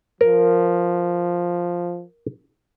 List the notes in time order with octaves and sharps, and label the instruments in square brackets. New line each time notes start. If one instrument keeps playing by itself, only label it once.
[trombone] F3 [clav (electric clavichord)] A#4